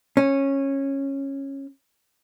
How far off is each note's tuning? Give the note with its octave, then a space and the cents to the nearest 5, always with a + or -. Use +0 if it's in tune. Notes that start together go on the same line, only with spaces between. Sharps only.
C#4 -15